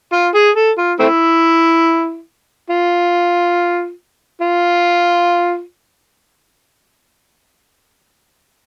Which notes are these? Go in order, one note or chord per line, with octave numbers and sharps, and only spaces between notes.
F4
G#4
A4
F4
A3 C4 E4
F4
F4